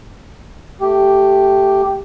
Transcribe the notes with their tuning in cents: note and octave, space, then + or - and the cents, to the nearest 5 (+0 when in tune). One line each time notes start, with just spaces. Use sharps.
A3 +0 G4 +0